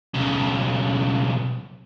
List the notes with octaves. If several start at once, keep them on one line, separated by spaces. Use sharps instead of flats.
B1 C#3